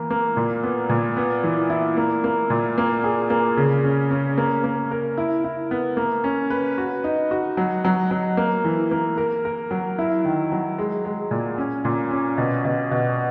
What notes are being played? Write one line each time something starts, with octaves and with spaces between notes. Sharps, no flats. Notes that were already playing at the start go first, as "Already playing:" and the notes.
Already playing: E3 A#3
A#3
A#2
B3
A#2
B3
E3
E4
A#3
A#3
A#2
A#3
G#4
A#3
C#3
C#4
C#4
A#3
A#3
A#4
E4
E4
B3
A#3
C#4
B4
F#4
D#4
F#4
F#3
F#3
F#3
A#3
E3
A#3
A#4
A#4
F#3
E4
D#3
F#3
G#3
G#3
A#2
C#4
A#2
C#4
B2
B2
B2